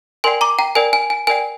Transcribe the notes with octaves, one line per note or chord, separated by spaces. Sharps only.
A#4 D5 G5 G#5 C6
A#5 D6
G5 A#5
A#4 D5 G5 G#5
G#5
G#5
A#4 D5 G5 G#5